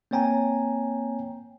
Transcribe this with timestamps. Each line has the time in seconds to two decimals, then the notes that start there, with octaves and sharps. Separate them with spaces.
0.11 A#3 C4 C#5 G5 G#5 A#5